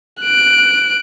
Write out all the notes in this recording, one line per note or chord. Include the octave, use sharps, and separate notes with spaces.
F#6 D7